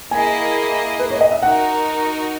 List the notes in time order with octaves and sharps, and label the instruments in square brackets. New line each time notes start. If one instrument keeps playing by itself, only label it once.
[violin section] A#3 E4 G#4 D#5 [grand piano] G#5
[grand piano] B4
C#5
D#5
E5
[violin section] D#4 F#4 A#4 [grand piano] F#5